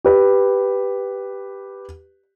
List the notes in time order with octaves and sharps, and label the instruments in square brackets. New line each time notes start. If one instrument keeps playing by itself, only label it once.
[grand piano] G4 B4